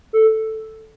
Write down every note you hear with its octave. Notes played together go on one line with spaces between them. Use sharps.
A4